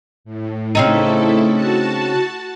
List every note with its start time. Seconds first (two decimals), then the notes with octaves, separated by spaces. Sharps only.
0.25 A2
0.75 C#3 A3 C4 D#4 E4 A4
1.51 F#4 A5